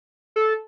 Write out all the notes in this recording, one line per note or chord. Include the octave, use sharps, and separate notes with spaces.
A4